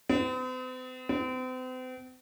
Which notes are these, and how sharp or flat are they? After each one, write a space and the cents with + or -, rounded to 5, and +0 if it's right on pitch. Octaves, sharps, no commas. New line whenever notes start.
C4 -45
C4 -40